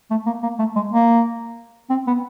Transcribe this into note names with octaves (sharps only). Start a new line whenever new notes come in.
A3
A#3
A#3
A3
G#3
A#3
C4
B3